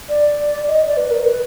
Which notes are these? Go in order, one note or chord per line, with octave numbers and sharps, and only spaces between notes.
D5
D#5
D5
B4
A#4
B4